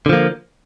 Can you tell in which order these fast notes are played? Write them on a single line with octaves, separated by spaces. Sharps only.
D3 F3 A#3